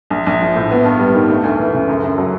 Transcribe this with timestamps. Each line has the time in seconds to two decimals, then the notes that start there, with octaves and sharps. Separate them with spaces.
0.11 A#1
0.26 A#1
0.41 F3
0.56 A2
0.71 B3
0.85 G2
0.99 G3
1.14 D#3
1.30 A3
1.44 D2
1.58 E3
1.73 C#3
1.89 F#2
2.04 F#2
2.18 F#3